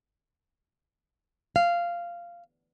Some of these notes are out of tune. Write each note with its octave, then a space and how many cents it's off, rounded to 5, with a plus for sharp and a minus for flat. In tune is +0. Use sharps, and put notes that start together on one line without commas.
F5 -10